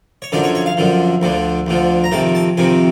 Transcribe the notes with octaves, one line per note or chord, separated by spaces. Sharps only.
C#5
F#2 D3 F3 D5
C#5
C#5
F5
F#2 D3 F3
D2 D3 F3
D2 D3 F3
A#5
F2 C3 D#3 A5
A5
F2 C3 D#3 G#5